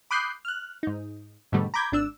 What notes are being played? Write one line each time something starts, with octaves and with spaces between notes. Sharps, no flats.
B5 D6 D#6 F#6 G6 C7
F6 F#6
G#2 D#4
G#2 B2 D3 G3 A3
A#5 B5 D6 G6 G#6
G#1 D4 E6